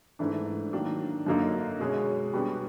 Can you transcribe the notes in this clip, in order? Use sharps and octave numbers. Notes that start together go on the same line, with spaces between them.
G#2 E3 A3 D4
D#3 F#3 A#3 D4
F#2 D3 F#3 A#3 D#4
B2 G#3 C#4
B2 G3 B3 D4